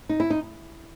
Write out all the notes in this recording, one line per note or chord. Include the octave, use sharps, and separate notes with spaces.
D#4
E4
D#4